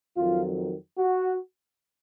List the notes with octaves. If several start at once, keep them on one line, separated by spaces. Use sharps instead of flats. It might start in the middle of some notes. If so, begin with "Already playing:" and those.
F2 D#3 F#3 F4
F#4